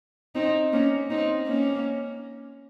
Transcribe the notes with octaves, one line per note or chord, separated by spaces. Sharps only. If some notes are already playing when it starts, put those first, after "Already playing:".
C4 D#4
A#3 C#4
C4 D#4
A#3 C#4